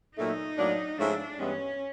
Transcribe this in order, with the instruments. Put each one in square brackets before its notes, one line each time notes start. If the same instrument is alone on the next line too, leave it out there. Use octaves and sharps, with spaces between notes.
[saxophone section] A#2 F#3 A3 [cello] D#4
[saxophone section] A2 F#3 A#3 D4
[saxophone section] G#2 F3 A3 C#4 E4 [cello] D4
[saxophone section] G2 E3 G#3 B3 [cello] C#4